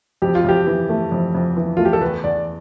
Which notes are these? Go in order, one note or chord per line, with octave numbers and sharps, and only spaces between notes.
F2 G4
F4
F2 G4
E3
A3
F2
F2
E3
A3 F4
G4
A4
E2 B4
E2 D5